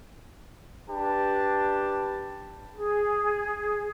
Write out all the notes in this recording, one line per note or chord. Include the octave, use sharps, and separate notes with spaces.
D4 G4 B4 A5
G#4